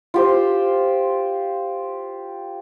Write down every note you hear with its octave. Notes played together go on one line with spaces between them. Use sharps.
F4 G4 C5